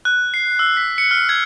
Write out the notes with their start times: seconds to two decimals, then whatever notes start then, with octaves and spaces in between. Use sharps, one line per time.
0.05 F#6
0.34 C7
0.59 E6
0.77 B6
0.98 C#7
1.11 F6
1.29 G#6